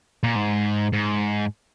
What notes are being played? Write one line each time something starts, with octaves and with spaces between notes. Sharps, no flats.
A#2
G#2
G#2